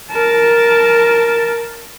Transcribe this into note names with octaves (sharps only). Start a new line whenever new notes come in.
A#4 A5